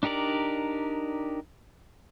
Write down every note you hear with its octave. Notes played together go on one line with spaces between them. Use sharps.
D4 D#4 G4 A#4 D5